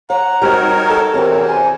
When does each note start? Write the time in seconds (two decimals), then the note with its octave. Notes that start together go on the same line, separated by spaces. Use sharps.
0.10 C#5 F#5 A#5
0.42 G3 C4 D#4 F#4 A#4 C#5
0.90 A4
1.14 E2 C3 E3 C4 F#4 A#4 C#5
1.48 C5 G#5